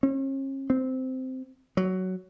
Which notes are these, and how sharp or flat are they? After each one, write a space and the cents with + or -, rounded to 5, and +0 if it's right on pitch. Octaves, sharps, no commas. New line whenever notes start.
C#4 -40
C4 -10
F#3 +10